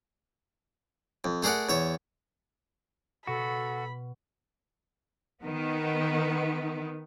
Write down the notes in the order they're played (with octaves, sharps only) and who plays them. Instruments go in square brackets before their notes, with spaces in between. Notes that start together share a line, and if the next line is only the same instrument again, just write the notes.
[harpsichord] F2
A3 G#4 A#4 D5 F#5
E2 C#5 E5
[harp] B2 [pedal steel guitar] F#4 [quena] A4 [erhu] B5
[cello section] D#3 B3